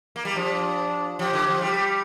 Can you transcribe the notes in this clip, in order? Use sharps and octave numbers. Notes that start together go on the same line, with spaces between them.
A#3
G3
F3 D4
F3 G4
D3
F3
G3 G4